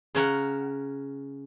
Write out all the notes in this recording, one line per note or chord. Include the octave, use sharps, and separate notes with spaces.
C#3 C#4 A#4 F#5